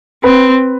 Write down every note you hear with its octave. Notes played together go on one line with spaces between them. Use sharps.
C4 B4